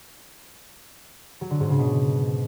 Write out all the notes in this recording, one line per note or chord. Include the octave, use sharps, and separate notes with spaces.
F#3
D3
G#2
C#3
B2